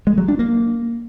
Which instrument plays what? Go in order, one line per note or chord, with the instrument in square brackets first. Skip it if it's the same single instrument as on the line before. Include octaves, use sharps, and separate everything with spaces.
[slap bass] G#3
F#3
D4
A#3